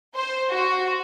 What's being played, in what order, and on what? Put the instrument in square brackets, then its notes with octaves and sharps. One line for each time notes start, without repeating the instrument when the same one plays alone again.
[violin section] C5
F#4